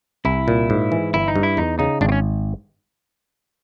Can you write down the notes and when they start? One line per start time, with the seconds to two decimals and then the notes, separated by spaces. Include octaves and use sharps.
0.25 C2 E4
0.48 A#2
0.70 G#2
0.92 E3
1.14 G1 E4
1.28 D#4
1.36 G2
1.43 E4
1.57 E2 D#4
1.79 C#3 D#4
2.01 G#1 D4
2.09 C4
2.12 C#4